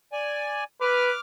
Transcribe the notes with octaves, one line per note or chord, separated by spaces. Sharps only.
D5 G#5
B4 D6 F6